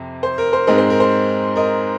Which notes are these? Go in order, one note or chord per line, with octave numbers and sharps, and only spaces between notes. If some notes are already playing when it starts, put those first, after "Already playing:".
Already playing: F2 C3
C5
A#4
C5
G#2 G#3 C4 A#4 D#5
C5
A#4
C5
A#4 D#5